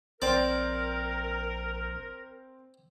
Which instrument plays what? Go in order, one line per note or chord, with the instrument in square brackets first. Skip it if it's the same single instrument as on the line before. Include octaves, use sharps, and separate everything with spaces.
[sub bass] A#1 [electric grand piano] C4 C5 G5 [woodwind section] A#4 [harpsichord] D5